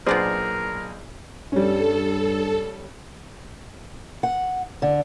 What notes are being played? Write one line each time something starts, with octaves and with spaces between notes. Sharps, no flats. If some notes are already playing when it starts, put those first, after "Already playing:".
B1 A#2 B3 D4 G#4 A#4 C5 D5
G2 G3 C#4 A4
F#5
D3